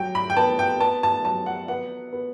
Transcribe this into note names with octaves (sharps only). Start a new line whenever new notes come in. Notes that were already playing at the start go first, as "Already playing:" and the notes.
Already playing: F#3 G5
B5
G5
B3 A5
G5
B3 A5
A5
F#3 A5
F#5
B3 F#5
B3